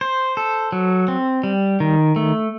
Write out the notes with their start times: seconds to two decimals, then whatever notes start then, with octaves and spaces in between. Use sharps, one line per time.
0.01 C5
0.37 A4
0.72 F#3
1.08 C4
1.44 G3
1.80 D#3
2.16 A3